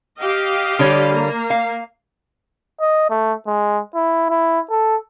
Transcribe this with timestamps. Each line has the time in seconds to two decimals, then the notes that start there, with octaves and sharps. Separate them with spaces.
0.19 G4 D#5 F5
0.79 D3 G3 C#5
1.13 A#3
1.50 F5
2.81 D#5
3.10 A3
3.47 G#3
3.95 E4
4.30 E4
4.70 A4